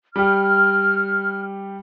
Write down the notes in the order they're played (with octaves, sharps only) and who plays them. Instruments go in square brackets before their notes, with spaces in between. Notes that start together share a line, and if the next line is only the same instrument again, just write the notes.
[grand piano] G3 G4 [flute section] F6